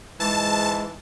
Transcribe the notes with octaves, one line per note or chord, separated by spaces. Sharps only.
G#2 E3 G#3 A5